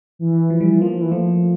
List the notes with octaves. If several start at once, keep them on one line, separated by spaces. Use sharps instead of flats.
E3
F3
G3
F3 A#3
F3
E3
F3 A3